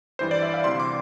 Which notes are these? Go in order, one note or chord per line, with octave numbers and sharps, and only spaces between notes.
G2 E3 G3 C5
D5
E5
F5
D2 C3 E3 G3 C6
D6